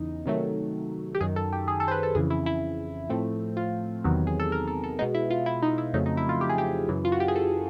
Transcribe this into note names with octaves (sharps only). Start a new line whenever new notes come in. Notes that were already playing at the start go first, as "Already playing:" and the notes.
Already playing: E2 C#3 E3 D#4
C3 D#3 F#3 A3
G4
F#2 D#3 F#3 G#4
A4
G4
G#4
A4
C5
B4
A4
F2 C#3 E3 G#4
E4
E4
A2 F3 A3 C4
F4
E2 C3 D#3 F#3 B3
G#4
A4
A#4
A4
A4
B2 G#3 B3 D#4
E4
F4
E4
D#4
E4
F2 C#3 F#3 A3 C4 D#4
D#4
E4
F4
G4
G#4
G4
F#2 C#3 E3
F4
F#4
G4
G#4
A4